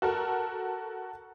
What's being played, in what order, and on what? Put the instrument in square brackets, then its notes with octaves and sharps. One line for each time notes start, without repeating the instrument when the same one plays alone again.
[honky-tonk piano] F#4 A4 A#4